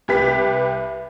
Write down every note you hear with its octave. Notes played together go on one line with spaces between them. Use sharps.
C2 G4 B4 B6